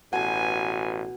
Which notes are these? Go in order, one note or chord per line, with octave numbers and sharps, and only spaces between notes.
A1 B2 A4 F#5 G#5